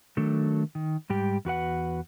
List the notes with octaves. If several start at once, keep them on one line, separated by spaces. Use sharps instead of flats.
D#3 F#3 A3 D4 A4
D#3
G#2 G3 G4
E2 F#4 B4 F#5